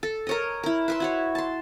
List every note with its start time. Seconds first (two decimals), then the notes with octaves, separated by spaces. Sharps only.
0.03 A4
0.27 A#4 C#5 D#5
0.63 E4 A#4
0.88 B4 E5 C6
1.00 E4 F#4 C#5
1.35 A5 C6